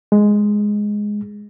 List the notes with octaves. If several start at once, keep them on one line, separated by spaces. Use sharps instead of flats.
G#3